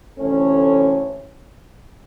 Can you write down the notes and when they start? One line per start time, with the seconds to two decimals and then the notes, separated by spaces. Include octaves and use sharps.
0.17 D2 C3 E3 A3 C#4